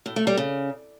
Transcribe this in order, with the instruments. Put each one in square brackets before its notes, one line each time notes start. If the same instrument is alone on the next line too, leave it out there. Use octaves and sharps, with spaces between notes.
[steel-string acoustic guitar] A2
A3
G3
C#3